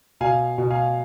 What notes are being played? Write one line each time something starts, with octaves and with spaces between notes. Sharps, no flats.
B2 F5 G#5
B2
F5 G#5